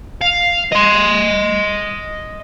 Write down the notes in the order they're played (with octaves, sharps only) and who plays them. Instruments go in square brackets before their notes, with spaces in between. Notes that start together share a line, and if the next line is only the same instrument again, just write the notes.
[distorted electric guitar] F5
D#5 C6